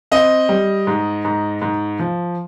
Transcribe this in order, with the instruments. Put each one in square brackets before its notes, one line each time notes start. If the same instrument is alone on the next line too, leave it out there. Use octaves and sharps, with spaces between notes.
[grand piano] C4 D#5
G3
G#2
G#2
G#2
F3